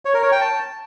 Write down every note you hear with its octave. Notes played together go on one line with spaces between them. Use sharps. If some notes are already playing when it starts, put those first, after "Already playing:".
C#5
A#4
C#5
G5
A5